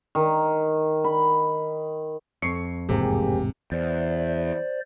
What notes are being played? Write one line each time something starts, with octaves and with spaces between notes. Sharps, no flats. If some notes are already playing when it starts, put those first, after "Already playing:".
D#3
B5
F2 C#6 C7 C#7
E1 A1 G#2 C3 A#3 G4 G#4
E2 C5 D5